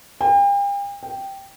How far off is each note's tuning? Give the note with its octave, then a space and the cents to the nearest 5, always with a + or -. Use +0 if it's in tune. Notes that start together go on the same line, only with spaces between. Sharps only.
G5 +40
G5 -5